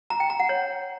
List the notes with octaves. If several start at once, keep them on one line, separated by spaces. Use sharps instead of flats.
A#5
G5
A#5
F#5
C#5